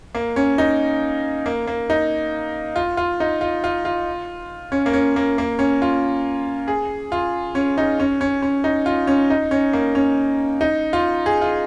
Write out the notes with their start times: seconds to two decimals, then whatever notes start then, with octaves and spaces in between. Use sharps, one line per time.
0.15 A#3
0.36 C#4
0.58 D#4
1.46 A#3
1.67 A#3
1.90 D#4
2.76 F4
2.97 F4
3.20 D#4
3.41 F4
3.64 F4
3.85 F4
4.72 C#4
4.86 A#3
4.93 C#4
5.16 A#3
5.38 A#3
5.59 C#4
5.82 F4
6.68 G#4
7.12 F4
7.55 C#4
7.78 D#4
8.00 C#4
8.21 C#4
8.42 C#4
8.64 D#4
8.86 F4
9.07 C#4
9.30 D#4
9.51 C#4
9.73 A#3
9.95 C#4
10.61 D#4
10.93 F4
11.26 G#4
11.42 F4